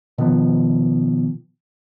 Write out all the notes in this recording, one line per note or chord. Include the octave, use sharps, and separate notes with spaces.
B2 D#3 F3 B3